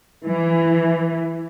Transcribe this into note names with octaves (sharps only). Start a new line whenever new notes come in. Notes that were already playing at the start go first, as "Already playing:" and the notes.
E3